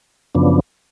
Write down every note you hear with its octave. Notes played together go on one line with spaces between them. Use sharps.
F#2 C#3 F3 B3 D4